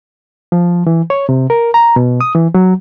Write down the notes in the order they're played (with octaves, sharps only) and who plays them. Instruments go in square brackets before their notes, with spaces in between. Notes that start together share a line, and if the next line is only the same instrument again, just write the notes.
[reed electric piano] F3
E3
C#5
C3
A#4
A#5
B2
D#6
E3
F#3